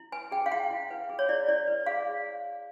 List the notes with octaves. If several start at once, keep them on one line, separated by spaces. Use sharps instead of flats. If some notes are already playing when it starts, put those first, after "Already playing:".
Already playing: E4
B4 G#5
G#4 G5
F5
E4 F#5
E4
B4
G#4
C#5
E4 D5
E4 D5
B4
G#4 F5